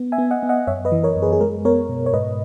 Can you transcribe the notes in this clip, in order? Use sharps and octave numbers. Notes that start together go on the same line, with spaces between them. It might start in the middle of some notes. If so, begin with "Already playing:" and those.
Already playing: B3
E5 G#5
B3
D#5 F#5
B3
D#5 F#5
F#2 C#5 E5
B4 D#5
E3
A#4 C#5
F#2
G#4 B4
G#4
G#3 A#4
B3 A#4 C#5
B2
C#5
G#2 B4 D#5